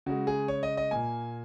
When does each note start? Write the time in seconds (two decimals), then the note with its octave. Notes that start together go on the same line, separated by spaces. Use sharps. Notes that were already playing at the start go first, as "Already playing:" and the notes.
0.06 C#3 G#3 F#4
0.27 G#4
0.48 C#5
0.63 D#5
0.77 D#5
0.91 A#2 A#3 G#5